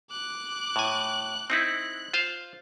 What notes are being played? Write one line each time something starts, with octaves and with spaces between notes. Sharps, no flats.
D6 F#6
A2 G#5
C4 D#4 E4 F#6
F4 C5 F5